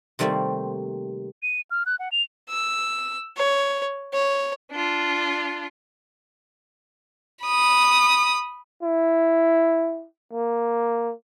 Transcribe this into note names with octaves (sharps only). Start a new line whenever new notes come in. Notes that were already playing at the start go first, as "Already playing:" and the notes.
C3 D#3 G3 A3 A#3 C4
D#7
F6
F#6
F#5
F7
E6
C#5
C#5
D4 F4
B5 D#6
E4
A#3